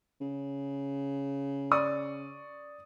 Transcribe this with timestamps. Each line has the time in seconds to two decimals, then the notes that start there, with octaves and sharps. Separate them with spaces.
0.21 C#3
1.71 D5 C#6 D#6